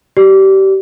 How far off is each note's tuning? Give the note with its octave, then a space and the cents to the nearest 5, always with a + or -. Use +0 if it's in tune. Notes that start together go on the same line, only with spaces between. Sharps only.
G4 -25 D5 +5